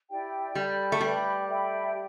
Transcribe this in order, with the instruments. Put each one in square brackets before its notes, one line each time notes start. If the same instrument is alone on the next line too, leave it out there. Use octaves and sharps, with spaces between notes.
[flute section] E4 G4 D5 G5
[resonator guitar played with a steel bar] G3 [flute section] A4 D5 G5 B5
[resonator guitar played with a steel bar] A3
[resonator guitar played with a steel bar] G3 [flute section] B4 G5 B5
[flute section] A4 E5 G5 B5
G4